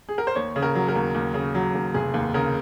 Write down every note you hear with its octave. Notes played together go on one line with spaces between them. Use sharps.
G#4
A#4
C5
D#2 C#5
C#3
A#4
F#3
A#4
D#2
D#2
C#3
F#3
D#2
F1 G#4
D#2
C#3 A#4